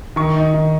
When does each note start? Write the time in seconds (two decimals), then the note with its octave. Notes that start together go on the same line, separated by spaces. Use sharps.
0.16 D#3 C#6
0.36 D#4
0.54 D#3